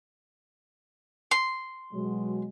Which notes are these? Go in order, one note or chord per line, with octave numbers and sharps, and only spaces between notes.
C6
B2 F#3 G#3